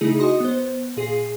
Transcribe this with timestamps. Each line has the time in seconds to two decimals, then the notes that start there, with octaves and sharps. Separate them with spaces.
0.01 C#3 A3 D#4 E4 G#4
0.19 F#4 D#5 C6 D#6
0.40 B3 C5
0.97 A#2 G#4 C7